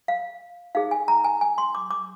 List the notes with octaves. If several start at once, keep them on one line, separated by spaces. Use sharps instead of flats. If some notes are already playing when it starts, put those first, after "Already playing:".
F5
D#4 G#4 C5 F5
G#5
A#5
G#5
G#5
C6
D6
D6